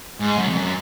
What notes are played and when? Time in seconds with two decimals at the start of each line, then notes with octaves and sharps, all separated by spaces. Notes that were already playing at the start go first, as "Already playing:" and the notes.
0.20 G#2
0.38 F#2
0.48 F2
0.56 F#2